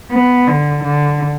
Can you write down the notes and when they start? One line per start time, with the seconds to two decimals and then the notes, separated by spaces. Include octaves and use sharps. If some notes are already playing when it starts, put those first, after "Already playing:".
0.11 B3
0.47 D3
0.84 D3